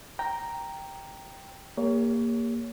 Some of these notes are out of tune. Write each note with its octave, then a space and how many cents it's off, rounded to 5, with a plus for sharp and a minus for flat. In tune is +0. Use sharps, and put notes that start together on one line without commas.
G5 +0 A#5 +0
A#3 +0 G4 +35 C#5 +25